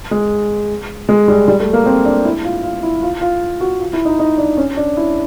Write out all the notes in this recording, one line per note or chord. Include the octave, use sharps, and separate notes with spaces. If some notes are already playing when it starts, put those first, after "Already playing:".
G#3
G#3
G3
G3
A3
A#3
C4
D4
E4
F4
F4
E4
F4
F4
F#4
F4
E4
D#4
D#4
D4
C#4
D4
E4